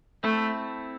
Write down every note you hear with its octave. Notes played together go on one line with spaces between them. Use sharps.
A3 C4 E4 A4